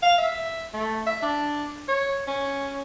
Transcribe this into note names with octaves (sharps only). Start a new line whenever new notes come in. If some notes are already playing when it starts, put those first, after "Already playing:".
F5
E5
A3
E5
D4
C#5
C#4